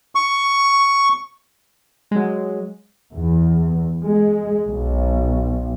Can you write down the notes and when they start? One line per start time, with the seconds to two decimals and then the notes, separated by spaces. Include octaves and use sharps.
0.15 C#6
2.11 F#3 G#3
3.12 E2
4.03 G#3
4.68 B1